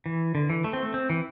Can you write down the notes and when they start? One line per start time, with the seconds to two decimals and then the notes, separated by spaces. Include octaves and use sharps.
0.06 E3
0.35 D3
0.50 E3
0.64 A3
0.73 C4
0.83 A3
0.94 C4
1.10 E3